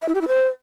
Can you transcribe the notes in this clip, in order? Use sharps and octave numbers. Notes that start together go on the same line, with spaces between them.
E5
E4
G4
E4
C5